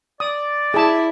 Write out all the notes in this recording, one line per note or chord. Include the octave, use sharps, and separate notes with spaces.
D5 D#6
E4 G#4 A5